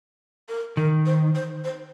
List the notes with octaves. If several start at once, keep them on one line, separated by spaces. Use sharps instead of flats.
A#4
D#3 A#4
C5
C5
C5